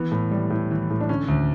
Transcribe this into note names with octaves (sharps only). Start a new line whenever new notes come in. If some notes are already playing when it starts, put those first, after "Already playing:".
Already playing: E3 B3
A2
G3
A2
E3
A2
D4
D3 C#4
D2